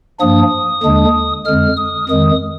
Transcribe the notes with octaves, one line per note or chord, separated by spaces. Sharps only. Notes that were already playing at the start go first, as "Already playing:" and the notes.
G2 F3 A#3 D4 D#6
D#2 D3 G#3 D4
F2 D3 G#3 F6
D#6
F2 D#3 G#3 D#6